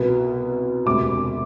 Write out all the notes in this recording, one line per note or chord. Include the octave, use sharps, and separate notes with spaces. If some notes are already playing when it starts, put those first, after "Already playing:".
Already playing: C2 B2 B3
E1 D2 C3 D6